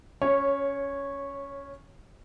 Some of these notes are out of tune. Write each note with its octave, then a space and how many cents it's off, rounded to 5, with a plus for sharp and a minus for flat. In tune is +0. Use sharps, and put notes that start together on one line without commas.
C#4 +10 C#5 -10